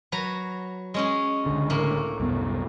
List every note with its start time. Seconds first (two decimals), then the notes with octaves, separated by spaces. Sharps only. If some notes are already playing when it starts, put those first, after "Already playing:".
0.12 F#3 B4 A#5
0.94 G#3 C#4 G#4
1.46 C#2 D3
1.70 A2 A#3
2.20 C2 F#2 B3